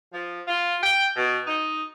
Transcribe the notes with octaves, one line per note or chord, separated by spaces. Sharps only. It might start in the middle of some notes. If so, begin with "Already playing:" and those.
F3
F4
G5
B2
D#4